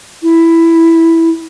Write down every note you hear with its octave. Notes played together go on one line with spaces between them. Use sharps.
E4